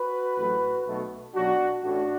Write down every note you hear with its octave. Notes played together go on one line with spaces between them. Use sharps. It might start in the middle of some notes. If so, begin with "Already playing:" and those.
Already playing: F#4 B4
A1 A2 F#3 A3
B1 B2 A3
B1 B2 F#3 D4 F#4
A1 A2 A3 D4 F#4